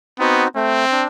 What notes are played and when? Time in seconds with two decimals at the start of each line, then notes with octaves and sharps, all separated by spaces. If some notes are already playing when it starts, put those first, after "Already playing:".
0.19 B3 C4 D#4 F#4
0.55 A3 C4
0.92 D4